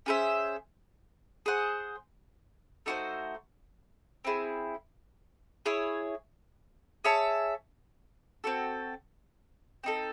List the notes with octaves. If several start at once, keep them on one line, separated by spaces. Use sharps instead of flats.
C#4 G#4 C5 E5
G#4 C5 F#5
A3 D#4 F#4 C5
C4 E4 G#4
E4 G#4 C#5
G#4 C#5 E5 A5
C4 F#4 A4
C4 D#4 A4